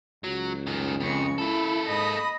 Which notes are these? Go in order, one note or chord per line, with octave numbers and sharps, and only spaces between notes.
C#2 F#3
F#2 D#3
F2 C#3 G#3 C#6
A#3 E4 A4
G#2 D#5 B5 D#6